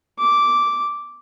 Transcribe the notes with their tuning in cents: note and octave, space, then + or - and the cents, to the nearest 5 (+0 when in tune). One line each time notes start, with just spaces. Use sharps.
D6 -5